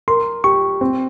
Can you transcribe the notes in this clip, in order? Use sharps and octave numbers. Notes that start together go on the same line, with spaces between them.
A#4 C6
G4 C#6
C4